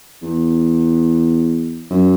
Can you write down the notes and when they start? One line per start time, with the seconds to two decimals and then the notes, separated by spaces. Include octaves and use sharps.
0.22 E2
1.90 F#2